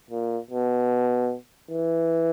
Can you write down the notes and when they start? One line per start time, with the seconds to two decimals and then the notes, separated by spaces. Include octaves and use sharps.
0.10 A#2
0.50 B2
1.71 E3